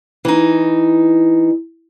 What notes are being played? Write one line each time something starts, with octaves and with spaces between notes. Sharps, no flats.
E3 D#4